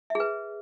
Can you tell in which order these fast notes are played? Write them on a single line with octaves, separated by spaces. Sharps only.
E5 G#4 B4